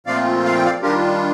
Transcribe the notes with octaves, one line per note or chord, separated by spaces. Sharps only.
A#2 F3 A3 C4 F4 D5 F5
F5
G5
D5 F5
D#3 G3 D4 F4 G4 A#4